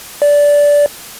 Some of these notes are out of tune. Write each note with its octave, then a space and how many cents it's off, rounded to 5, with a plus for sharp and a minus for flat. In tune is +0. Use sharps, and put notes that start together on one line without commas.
D5 -15